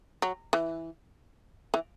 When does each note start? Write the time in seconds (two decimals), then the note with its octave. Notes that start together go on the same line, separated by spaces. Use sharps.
0.22 F#3
0.53 E3
1.74 E3